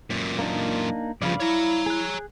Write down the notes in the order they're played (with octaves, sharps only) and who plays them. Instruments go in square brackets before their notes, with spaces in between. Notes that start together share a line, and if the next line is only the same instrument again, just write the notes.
[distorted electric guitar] F#2 A#2
[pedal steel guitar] A#3 D4 D#4
[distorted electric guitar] G2 C#3 [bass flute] F3 [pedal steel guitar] D5 F5 B5
[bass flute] E4 [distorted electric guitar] C#5 A#5
[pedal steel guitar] G#4 F#6